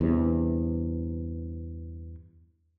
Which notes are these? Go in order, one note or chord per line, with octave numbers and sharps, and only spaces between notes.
E2 G2 C3